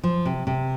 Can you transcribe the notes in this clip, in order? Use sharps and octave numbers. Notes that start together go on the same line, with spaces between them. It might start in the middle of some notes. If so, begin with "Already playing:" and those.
F3
C3
C3